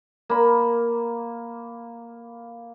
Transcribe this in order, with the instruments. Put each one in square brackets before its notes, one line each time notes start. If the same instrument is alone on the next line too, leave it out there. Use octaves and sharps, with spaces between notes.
[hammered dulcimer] A#3 B5